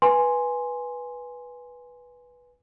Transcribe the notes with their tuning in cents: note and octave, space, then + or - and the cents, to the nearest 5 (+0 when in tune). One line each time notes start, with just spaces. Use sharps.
B4 -10 G#5 +0 C6 +0